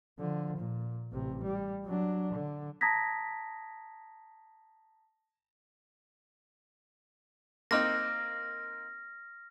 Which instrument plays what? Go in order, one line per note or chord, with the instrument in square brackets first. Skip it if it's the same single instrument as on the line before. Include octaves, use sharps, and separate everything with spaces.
[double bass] D3 F3
A#2
A1 C3
G3
F#3 D4
D3
[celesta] A5 A#5 D#6 G#6 A#6 B6
[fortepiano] A#3 C4 D#4 [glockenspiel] F6 A#6